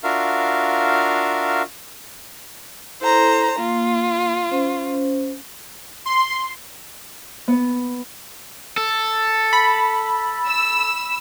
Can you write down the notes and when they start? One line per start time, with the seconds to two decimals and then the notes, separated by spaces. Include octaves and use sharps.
0.04 D4 F4 F#4 A#4 E5 F5
3.01 E4 A4 C5 A#5
3.58 A#3 F4
4.51 C#4 C5
6.06 C6
7.48 B3
8.78 A4
9.53 B5
10.48 E6